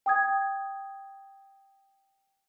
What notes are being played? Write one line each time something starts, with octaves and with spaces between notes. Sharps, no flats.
G5 D#6 G#6